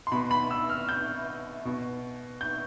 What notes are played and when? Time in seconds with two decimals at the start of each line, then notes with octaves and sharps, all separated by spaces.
0.07 C6
0.12 B2 B5
0.31 B5
0.51 E6
0.69 F6
0.89 G6
1.65 B2
2.41 G6